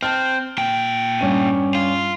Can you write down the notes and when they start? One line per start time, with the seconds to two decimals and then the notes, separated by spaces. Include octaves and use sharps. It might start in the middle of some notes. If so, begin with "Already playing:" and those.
0.03 C4 A5 F6
0.58 A#2 G5
1.19 G2 C#4 D#7
1.75 F4